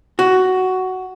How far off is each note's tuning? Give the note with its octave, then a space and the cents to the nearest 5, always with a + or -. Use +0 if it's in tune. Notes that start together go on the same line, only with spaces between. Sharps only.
F#4 +10